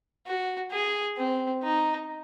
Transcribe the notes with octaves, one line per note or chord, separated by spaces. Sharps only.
F#4
G#4
C4
D#4